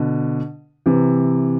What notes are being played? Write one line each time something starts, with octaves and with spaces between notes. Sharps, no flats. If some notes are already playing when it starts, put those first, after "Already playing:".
Already playing: B2 D3
C3 E3